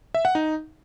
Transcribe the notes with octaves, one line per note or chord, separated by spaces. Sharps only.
E5
F#5
D#4